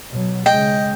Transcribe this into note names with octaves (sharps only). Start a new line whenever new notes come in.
B2 F#3
C#3 G#3 D#5 G5